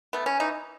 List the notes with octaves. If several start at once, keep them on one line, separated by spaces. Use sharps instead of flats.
A3 B3
C#4
E3 D#4